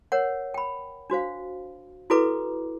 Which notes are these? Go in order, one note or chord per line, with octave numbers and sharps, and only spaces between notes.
A#4 C#5 F#5
G5 B5
D4 F#4 C5 F5
E4 F#4 A4 B4 A#5 D6